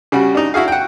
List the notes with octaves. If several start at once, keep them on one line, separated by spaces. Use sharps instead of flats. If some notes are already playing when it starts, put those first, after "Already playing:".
C#3 G3 F#4
D4 D#4
E4 F#4 G#4 F5
F#5 G5